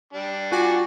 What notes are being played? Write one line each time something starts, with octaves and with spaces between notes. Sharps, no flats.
G3 D4
F4 F#4 G#5 D6